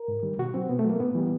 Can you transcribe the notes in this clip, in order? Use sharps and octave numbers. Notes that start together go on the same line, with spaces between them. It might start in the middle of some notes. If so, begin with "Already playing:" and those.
Already playing: A#4
G#2
D#3 G3
B2 F#4
F#3 C4
B2 B3
A3
F#3
A#3
A2 B3
E3 G3